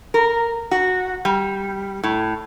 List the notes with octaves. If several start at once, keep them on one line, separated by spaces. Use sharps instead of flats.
A#4
F#4
G3
A2